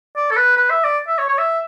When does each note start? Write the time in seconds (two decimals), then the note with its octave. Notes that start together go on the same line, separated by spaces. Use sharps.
0.16 D5
0.31 A4
0.37 B4
0.57 B4
0.70 E5
0.84 D5
1.08 E5
1.18 C#5
1.28 C#5
1.38 E5